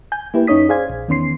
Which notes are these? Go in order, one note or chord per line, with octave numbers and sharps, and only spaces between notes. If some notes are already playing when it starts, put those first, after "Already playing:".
G#5 G6
A#3 E4 G4 B4
F#2 C#4 D#4 C#5 D#6 B6
G#4 C5 D5 F5 G#5 G#6
A#1
E2 D#3 B3 C#4 C6 C7